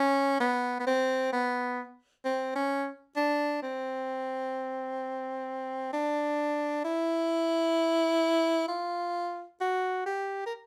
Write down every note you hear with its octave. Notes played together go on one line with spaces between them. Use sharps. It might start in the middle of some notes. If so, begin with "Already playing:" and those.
Already playing: C#4
B3
B3
C4
B3
C4
C#4
D4
C4
D4
E4
F4
F#4
G4
A#4